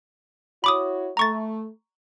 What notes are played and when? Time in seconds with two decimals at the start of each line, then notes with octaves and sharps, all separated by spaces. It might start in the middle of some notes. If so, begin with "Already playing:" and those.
0.64 E4 F#4 C#5 B5 D6 D#6
1.17 A3 A#5 C#6 A6